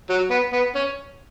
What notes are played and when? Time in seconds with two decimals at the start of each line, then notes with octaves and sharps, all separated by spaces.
0.09 F#3
0.31 B3
0.53 B3
0.75 C#4